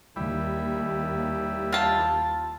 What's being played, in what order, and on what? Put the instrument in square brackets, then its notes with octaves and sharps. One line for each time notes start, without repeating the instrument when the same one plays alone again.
[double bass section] D#2 [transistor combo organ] G3 E4
[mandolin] F4 A5